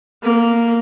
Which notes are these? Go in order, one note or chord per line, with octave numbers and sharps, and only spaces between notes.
A#3